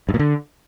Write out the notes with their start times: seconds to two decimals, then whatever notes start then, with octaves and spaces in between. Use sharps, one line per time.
0.09 G2
0.14 A#2
0.19 D3